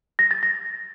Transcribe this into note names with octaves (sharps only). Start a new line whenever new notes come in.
A#6
A6
A#6